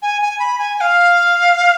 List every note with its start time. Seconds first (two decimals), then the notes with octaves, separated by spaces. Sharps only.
0.02 G#5
0.22 G#5
0.39 B5
0.59 G#5
0.77 G#5
0.81 F5